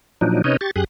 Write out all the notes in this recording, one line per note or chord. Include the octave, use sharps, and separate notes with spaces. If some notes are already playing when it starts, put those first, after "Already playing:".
A#2 F3 F#3 D4 D#4
C3 C#4 D#4 B4 C#5 D#5
G4 C#6 A6
F#2 G4 G#4 D#6 F#6